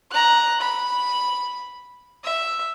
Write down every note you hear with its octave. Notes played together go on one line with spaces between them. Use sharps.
A#5 F#6
B5
E5